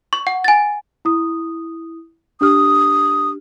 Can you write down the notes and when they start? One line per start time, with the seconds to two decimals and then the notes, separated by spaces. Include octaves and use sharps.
0.13 C#6
0.27 F#5
0.44 G#5 A6
1.05 E4 D#6
2.41 D4 G4 D#6 F6